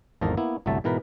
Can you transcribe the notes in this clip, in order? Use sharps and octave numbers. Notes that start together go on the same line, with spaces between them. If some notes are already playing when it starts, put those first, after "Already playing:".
G#1 E2 F3 D#4 A4 A#4
A#3 B3 E4
G1 C2 F#3 A3 E5 A5
G#2 B2 E3 A#4 B4